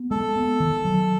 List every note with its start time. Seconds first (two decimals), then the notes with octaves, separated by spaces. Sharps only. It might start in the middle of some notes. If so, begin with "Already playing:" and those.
Already playing: B3
0.11 G#3 A4
0.36 B3
0.60 D#3
0.85 F#3